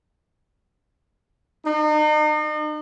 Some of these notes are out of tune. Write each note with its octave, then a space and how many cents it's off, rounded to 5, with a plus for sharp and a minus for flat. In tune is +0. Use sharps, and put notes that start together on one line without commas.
D#4 -40